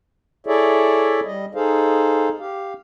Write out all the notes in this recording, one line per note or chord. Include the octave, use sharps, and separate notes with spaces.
E4 G#4 A4 C#5 D5 E5
G3 D#5
D#4 G#4 A4 C5 F5
G4 F5